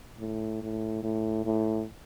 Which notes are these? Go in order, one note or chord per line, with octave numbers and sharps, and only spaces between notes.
A2
A2
A2
A2